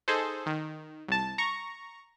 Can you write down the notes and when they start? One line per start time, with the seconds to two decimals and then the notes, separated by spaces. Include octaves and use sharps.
0.08 D#4 G#4 A4 C5
0.46 D#3
1.08 C2 A5
1.38 A#5 C#6